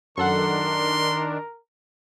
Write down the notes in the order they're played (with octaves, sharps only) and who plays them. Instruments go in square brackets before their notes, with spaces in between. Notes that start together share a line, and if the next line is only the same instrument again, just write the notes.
[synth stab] F#2 A4 F#5 [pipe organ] D#3 D4 [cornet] A#4 [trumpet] C6